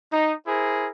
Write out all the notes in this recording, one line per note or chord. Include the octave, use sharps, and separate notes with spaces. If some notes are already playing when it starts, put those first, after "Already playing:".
D#4
E4 G#4 A#4 C5